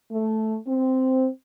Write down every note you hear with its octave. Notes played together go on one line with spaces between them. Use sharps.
A3
C4